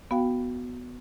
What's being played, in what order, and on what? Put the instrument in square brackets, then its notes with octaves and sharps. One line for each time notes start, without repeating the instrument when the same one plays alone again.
[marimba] B3 F#4 F5 G5